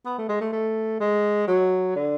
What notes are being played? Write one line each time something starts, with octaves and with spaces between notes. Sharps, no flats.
B3
A3
G#3
A3
A3
G#3
F#3
D3